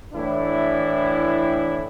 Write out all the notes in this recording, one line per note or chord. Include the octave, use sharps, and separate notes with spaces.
A2 E3 D4 E4